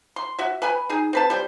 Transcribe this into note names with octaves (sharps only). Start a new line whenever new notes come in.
C6
F#4 E5
B4 G#5 B5
D#4 G#4
C4 B4 A5
G3 C5